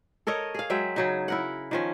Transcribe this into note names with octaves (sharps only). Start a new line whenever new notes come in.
A4 A#4 C#5 D#5
G#4 F5
F#3 G#3 E5 G5
C#3 F#3 D#4
E4 A#4 F#5
D#3 F3 C#4